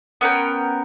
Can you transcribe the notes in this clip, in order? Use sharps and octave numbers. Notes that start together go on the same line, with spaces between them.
B3 C#4 A#4 G5